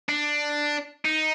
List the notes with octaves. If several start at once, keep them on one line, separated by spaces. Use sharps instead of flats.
D4
D#4